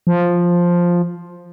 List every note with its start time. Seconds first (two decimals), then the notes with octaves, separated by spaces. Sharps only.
0.07 F3